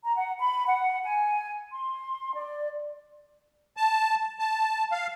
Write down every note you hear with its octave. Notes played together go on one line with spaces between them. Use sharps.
A#5
F#5
B5
F#5
G#5
C6
D5
A5
A5
F5